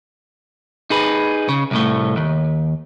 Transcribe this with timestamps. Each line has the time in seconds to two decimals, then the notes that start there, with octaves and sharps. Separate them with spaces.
0.90 D#4 G#4 B4
1.49 C#3
1.71 C2 A2 A3
2.17 D#2